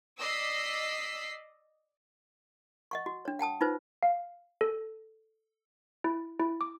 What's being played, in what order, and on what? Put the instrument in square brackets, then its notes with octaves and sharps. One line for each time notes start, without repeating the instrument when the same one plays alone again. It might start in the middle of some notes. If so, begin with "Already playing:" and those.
[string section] D5 D#5 E6 B6 C7
[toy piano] D#5 F#5 C#6
F#4
D4 C#5
F#5 G5 A5 D#6
D#4 F4 B4 C5
[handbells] F5
A4
E4
E4
D6